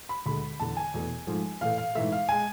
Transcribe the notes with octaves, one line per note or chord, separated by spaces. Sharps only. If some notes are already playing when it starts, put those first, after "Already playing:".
B5
D2 D3 G#3 B5
E2 D3 A3 A5
G#5
E2 B2 A3
G#2 F3 A3
A2 E3 A3 F5
F5
G#2 E3 A3 E5
F5
G#3 G#5